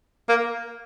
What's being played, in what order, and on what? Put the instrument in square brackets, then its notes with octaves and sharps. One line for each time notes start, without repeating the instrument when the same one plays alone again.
[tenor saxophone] A#3